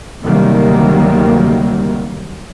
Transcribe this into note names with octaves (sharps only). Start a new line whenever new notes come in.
D2 C3 D#3 F#3 G3 A#3